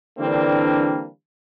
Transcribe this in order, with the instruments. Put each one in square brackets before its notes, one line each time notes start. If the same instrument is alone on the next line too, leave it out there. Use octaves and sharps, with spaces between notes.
[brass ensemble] D3 E3 G3 A#3 C4 D4